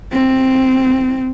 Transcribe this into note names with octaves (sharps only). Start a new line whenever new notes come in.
C4